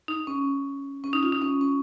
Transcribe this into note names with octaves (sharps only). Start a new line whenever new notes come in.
D#4
C#4
C#4
D#4
F4
D#4
C#4
C#4